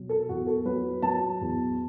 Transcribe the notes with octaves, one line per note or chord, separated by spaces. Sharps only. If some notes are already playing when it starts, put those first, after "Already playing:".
Already playing: B2 F#3
A4
E2 F#4
A4
F#3 B4
F#3 A5
E2